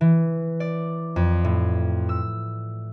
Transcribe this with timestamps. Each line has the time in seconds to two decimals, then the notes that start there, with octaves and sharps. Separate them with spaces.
0.01 E3
0.60 D5
1.16 F2
1.44 A2
2.09 E6